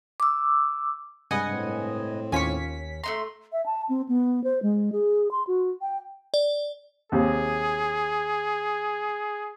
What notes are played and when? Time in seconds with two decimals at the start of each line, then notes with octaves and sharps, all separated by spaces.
0.20 D6 E6
1.31 G2 C3 G#3 B4 D#5 F#5 G#5
1.49 A2 C4
2.32 D#2 D#3 C#4 F4 G#5 C#6 B6
3.04 A3 D#4 A#5 C6
3.52 E5
3.66 A5
3.89 C4
4.09 B3
4.44 C5
4.63 G#3
4.92 G#4
5.31 C6
5.47 F#4
5.81 G5
6.34 D5
7.12 D#2 C3 G#4